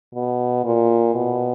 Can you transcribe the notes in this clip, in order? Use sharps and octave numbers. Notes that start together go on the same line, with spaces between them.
B2
A#2
B2